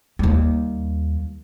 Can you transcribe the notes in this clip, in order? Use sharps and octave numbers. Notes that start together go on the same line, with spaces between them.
D#2 G3